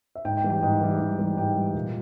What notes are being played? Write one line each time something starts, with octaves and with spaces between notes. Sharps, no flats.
E5
G#2 G5
G5
E3 G3
G5
G#2 G5
E3 G3
G#2
E3 G3
G#2 G5
E3 G3
A#2